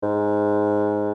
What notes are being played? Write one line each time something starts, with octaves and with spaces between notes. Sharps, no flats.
G#2